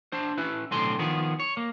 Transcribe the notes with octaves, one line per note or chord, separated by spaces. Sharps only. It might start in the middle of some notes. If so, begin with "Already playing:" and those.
D4 C5
C#4 E4 B4
B1 A2 D3 C4 G#5 C6
D#3 F3 B3 G#4
C#5
A#3